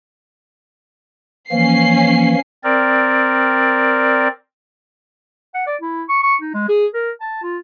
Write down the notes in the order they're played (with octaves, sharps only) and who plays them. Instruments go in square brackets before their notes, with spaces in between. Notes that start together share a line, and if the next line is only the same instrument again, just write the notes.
[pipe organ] E3 F3 A#3 [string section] C#4 C7
[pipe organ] C4 A#4 D5
[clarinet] F#5
D5
E4
C#6
C#6
D#4
G#3
G#4
A#4
A5
F4